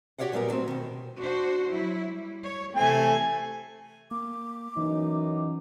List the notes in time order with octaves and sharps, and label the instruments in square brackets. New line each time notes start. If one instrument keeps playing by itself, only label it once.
[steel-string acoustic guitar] F#4 G4 C#5 D5 F5 F#5
A#2 F#3 G3 B3 A#4
A2 F#3 C4
B2 D#3
[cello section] D4 F#4 C5
F#3 E4
G3
C#5
[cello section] C3 E3 C4 [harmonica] A3 G#5
[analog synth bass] A#3 [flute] D6
[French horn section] F#2 C#4 D#4 [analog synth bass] E3